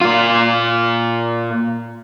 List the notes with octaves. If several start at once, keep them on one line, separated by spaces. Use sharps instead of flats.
A#2 F4